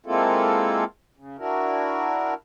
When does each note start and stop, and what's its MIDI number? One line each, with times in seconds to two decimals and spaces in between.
0.06 0.84 56
0.06 0.84 58
0.06 0.84 60
0.06 0.84 64
0.06 0.84 65
0.06 0.84 69
1.17 1.37 49
1.38 2.34 62
1.38 2.34 64
1.38 2.34 66
1.38 2.34 70